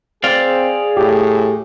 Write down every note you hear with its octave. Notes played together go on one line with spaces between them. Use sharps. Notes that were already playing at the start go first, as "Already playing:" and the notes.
C4 G#4 D5 F5
A2 G4